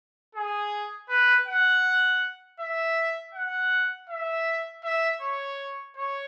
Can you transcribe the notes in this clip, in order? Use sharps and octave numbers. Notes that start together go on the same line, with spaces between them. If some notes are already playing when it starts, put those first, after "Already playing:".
G#4
B4
F#5
E5
F#5
E5
E5
C#5
C#5